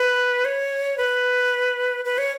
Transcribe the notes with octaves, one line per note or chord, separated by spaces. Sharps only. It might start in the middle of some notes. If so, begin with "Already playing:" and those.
Already playing: B4
C#5
B4
B4
C#5